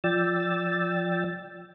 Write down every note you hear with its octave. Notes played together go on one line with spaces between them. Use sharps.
F3 D5 G5 E6 A6